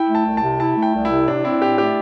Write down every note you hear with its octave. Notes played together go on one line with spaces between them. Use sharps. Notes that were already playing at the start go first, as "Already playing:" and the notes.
Already playing: E4 G5
A3
A5
C2
A5
C3
E4 A5
A3
G5
C2
E4
C3
A2 D4
C4 E4
A2 G4
A3 G4